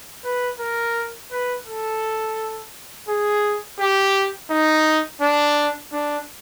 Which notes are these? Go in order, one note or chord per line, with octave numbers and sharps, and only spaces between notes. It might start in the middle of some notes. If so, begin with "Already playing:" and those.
B4
A#4
B4
A4
G#4
G4
D#4
D4
D4